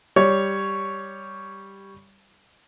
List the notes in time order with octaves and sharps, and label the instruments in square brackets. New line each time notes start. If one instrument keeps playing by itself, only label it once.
[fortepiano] G3 C#5